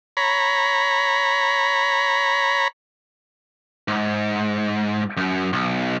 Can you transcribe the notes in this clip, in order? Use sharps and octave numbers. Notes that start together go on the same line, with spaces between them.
C#5 A#5 B5
G#2
F#2
B1